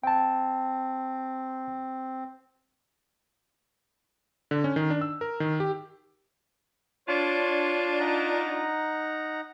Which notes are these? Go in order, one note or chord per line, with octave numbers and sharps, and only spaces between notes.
C4 G5 A5
D3
C#4
D#3
D4
E6
A#4
D#3
G4
D4 F4 C#5 C6
D#4 F#5 A#5